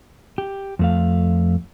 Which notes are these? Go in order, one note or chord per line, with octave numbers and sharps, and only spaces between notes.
G4
F2 A3 F5